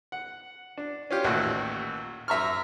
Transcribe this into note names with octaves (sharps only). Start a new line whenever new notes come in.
F#5
D4
C#4 F4 G4
A1 D#2 A#2 F#4 D#5
F#2 E5 A#5 C#6 F6